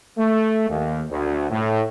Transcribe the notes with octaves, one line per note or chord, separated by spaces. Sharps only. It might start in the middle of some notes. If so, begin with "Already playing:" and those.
A3
D#2
D2
A2